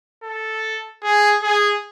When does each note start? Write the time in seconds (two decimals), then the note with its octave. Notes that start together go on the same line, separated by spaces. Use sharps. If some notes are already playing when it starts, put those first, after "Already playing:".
0.23 A4
1.03 G#4
1.43 G#4